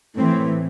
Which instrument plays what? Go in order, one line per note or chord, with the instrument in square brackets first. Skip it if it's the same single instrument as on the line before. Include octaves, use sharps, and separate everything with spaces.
[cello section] A2 E3 C4